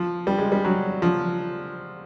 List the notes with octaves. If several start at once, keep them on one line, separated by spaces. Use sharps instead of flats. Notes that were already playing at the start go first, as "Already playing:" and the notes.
Already playing: F3
G3
G#3
G3
F#3
F3